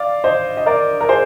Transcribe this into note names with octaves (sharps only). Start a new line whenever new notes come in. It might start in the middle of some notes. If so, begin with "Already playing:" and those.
Already playing: D5 F5
C5 D#5
D#5
A#4 D5
A#4
G#4 C5